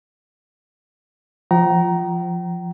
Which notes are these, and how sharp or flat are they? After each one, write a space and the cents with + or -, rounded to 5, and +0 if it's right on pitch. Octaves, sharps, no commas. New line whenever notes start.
F3 +0 G5 -40 A#5 +10